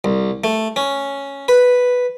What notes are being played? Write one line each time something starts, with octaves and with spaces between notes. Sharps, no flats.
C2
A3
C#4
B4